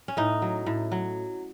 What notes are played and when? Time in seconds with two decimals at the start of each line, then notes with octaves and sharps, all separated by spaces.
0.08 C#4
0.17 A2 D#4
0.42 F#3
0.66 A2
0.92 F#3